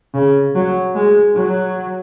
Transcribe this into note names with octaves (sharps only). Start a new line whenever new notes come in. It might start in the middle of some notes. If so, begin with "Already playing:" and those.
C#3
F#3
G#3
F#3